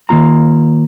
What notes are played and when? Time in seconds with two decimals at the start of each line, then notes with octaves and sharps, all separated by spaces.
0.09 D#3 A#3 F4 A#5